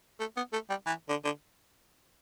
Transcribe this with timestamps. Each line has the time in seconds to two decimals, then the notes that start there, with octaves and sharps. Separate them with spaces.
0.20 A3
0.37 B3
0.53 A3
0.70 G3
0.86 E3
1.09 D3
1.24 D3